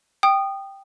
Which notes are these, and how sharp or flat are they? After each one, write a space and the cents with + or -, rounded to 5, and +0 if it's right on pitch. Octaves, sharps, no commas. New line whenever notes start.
G5 +0 D#6 -20